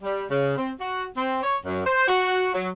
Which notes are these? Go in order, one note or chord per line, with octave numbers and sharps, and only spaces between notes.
G3
C#3
C4
F#4
C4
C#5
F#2
C5
F#4
F#3